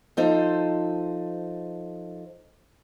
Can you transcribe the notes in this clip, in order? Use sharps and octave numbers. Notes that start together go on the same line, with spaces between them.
F3 D#4 A4 C5